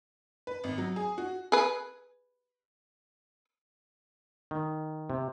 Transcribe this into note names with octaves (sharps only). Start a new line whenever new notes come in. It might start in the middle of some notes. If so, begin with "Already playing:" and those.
B4
G#1
F#3
G#4
F#4
G#4 B4
D#3
C3